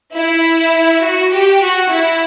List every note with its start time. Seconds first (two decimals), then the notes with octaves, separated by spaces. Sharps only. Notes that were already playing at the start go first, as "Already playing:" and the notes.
0.14 E4
1.02 F#4
1.32 G4
1.62 F#4
1.91 E4